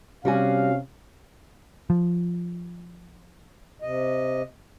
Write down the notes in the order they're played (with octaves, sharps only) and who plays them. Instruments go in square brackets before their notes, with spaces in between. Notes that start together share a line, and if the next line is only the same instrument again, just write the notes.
[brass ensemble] C3 C#4 F5 [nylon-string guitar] G3 F#4 G#5
[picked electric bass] F3
[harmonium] C3 D#5